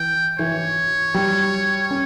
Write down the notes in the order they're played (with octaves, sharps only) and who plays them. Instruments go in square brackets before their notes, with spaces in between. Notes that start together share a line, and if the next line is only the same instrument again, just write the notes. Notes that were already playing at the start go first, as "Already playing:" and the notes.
Already playing: [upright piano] E3 [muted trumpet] G5
[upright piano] E3 [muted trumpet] C#5
[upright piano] G3
C#4